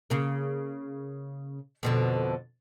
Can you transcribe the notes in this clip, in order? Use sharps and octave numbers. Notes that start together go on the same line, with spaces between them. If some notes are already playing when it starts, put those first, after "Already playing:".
C#3 A#3
F2 B2 D3